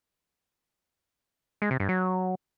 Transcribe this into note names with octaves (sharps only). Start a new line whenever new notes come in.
G#3
C3
G2
F#3